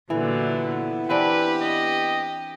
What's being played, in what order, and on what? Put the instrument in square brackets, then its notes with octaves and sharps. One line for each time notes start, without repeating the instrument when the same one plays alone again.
[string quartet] A#2 D3 F#3 [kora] E3 [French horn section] B3 E4
[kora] E3 C4 D4 [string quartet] G4 [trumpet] B4
[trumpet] D#5